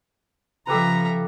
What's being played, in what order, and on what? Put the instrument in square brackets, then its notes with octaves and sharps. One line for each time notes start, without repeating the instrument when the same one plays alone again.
[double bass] C#3 F3 [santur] G4 A4 B4 [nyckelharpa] E5 A#5